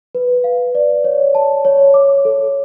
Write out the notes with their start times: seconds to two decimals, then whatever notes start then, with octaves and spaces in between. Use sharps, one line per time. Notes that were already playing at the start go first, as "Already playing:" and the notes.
0.15 B4
0.44 F5
0.75 D5
1.04 C#5
1.35 A5
1.65 C#5
1.94 D6
2.25 A4